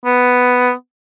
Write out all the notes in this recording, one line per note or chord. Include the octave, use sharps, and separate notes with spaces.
B3